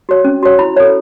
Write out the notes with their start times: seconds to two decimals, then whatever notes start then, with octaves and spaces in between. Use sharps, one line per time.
0.09 F#4 C#5
0.24 C#4
0.43 F#4 C#5
0.59 E4 B5
0.77 A4 C#5